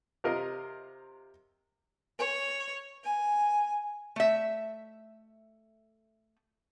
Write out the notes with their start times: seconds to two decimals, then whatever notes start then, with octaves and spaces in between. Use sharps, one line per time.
0.24 C3 F4 A#4 D#5
2.19 C#5
3.04 G#5
4.16 A3 E5